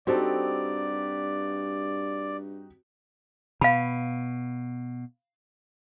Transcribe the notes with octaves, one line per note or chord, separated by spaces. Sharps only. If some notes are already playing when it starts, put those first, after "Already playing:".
G2 C4 D#4 F#4 G4 A4 D5
B2 F5 B5